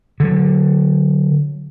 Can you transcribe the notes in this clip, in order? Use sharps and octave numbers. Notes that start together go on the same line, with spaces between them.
D3 F#3